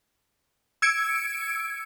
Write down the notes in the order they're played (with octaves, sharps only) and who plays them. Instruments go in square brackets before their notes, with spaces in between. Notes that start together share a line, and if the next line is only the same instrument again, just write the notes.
[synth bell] E6 G#6 C#7 D7